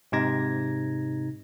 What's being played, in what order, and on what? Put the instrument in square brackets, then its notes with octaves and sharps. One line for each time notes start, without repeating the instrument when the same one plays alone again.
[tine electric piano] G#2 C3 D#4 G#6 A#6